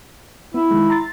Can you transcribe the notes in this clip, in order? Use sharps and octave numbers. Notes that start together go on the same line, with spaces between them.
B3 E4
D#3 G#3
A#5 C6 A6